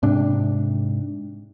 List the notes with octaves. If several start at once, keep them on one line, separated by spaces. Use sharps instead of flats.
G#2 C3 D4